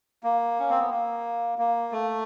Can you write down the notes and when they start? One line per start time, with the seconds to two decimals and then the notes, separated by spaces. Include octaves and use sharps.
0.24 A#3
0.60 C#4
0.70 C4
0.80 B3
0.90 A#3
1.58 A#3
1.92 A3